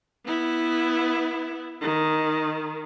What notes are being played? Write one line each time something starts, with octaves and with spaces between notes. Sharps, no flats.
B3 E4
D#3